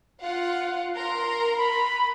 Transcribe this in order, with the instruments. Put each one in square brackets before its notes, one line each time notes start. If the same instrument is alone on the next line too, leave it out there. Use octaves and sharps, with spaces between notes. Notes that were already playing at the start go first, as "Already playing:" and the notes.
[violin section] F4 F5 F#5
A#4 A#5 C6
[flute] B5